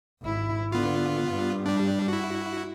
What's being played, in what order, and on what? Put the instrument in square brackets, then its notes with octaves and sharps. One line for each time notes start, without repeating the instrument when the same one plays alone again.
[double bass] G#1 E4
[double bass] D3 [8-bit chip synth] B3 F4
[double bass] G2
[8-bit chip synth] G3 D4
E4 F#4